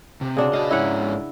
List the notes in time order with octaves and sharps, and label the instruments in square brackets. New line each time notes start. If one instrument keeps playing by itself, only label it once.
[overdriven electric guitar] C3
[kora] C#3 D4 F#4
[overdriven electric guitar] F#4 D#5 [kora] F5
[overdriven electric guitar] G#2 C#4 [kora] E4 F#5